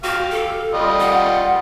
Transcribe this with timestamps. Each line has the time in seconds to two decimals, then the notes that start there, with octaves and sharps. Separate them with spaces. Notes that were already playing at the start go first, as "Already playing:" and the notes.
0.04 F#4 G4 F5
0.30 A4
0.74 G3 F4 D#5
1.00 F#5